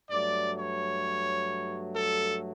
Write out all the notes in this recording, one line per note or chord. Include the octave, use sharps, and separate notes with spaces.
G2 F#3 A3 D5
C#5
A4